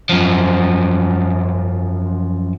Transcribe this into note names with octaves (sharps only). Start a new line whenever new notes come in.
F#2 F3